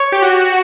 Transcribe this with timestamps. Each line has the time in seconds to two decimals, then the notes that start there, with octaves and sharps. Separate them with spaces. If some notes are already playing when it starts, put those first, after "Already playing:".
Already playing: C#5
0.12 G4
0.22 F#4